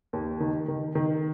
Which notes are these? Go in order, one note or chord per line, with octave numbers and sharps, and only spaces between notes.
D#2
D#3
D#3
D#3